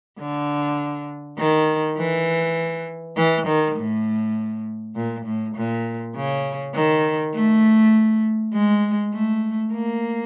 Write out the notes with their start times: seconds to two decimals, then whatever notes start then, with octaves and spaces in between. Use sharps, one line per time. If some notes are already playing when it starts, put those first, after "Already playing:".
0.19 D3
1.38 D#3
1.97 E3
3.17 E3
3.47 D#3
3.77 A2
4.96 A#2
5.26 A2
5.55 A#2
6.15 C#3
6.74 D#3
7.34 A3
8.53 G#3
9.13 A3
9.73 A#3